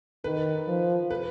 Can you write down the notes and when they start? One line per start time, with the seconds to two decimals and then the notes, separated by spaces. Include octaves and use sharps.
0.24 D#3 B4
0.67 F3
1.11 B4